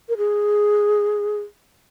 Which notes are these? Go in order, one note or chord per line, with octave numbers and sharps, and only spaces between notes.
A#4
G#4